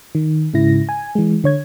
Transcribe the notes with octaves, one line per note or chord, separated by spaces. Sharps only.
D#3
G#2 C#3 E4 A#6
G#5
E3 G#3
D3 C#5 G#6